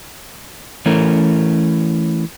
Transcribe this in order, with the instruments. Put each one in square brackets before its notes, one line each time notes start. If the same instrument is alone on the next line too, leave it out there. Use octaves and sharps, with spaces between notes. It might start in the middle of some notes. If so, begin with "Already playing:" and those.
[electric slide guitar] E3 A3 C#4 A#4